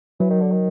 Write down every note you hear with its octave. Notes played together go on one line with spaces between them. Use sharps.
E3 F#3
D#3
D3
D#3